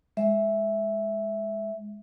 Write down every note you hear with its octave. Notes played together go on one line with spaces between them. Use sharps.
G#3 E5